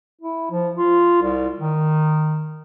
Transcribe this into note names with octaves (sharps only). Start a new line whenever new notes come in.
E4
F3
F4
C2
D#3